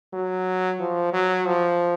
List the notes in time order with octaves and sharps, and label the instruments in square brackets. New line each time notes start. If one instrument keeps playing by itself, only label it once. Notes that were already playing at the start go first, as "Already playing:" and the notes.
[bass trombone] F#3
F3
F#3
F3